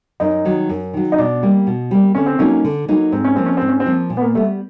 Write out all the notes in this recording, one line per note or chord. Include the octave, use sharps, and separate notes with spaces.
F#2 D#4
D#3 F#3
F#2
D#3 F#3
D#4
B2 D4
G3 A#3
B2
G3 A#3
D3 C#4
C4
F#3 A#3 C#4 D#4
D3
F#3 A#3 D#4
G#2 C4
C#4
F3 A#3 C4
C#4
G#2 C4
C#4
C4
F3 A#3
A#2
B3
A#3
G3 A3 B3